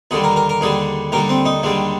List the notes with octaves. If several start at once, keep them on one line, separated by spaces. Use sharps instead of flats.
D#2 D3 G3 G#4
A#4
A#4
A#4
D#2 D3 G3 G#4
D#2 D3 G3 A#4
C4
D#4
D#2 D3 G3 G#3